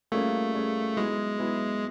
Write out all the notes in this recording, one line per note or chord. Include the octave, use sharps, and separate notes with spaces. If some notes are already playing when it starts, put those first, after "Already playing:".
G3 A3 A#3 C#4 F4 G#4
G3 A#3 C#4 F4 G#4
F#3 G#3 B3 E4 G#4 B4
F#3 B3 E4 G#4 B4